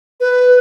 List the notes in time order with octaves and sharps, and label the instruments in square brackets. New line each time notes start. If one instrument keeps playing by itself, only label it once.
[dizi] B4